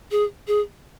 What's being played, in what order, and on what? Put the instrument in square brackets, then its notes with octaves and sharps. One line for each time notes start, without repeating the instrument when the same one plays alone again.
[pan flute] G#4
G#4